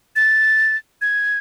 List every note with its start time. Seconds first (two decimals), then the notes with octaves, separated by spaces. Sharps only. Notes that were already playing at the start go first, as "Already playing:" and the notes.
0.16 A6
1.01 G#6